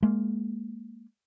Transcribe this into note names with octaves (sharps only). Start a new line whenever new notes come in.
G#3 A#3